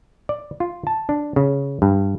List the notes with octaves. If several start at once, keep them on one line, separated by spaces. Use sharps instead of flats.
D5
F4
A5
D4
C#3
G2